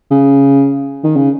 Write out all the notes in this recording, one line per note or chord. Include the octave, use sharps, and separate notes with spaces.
C#3
D#3
C#3